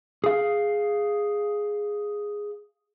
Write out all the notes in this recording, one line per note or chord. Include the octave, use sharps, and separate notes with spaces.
G#4 F5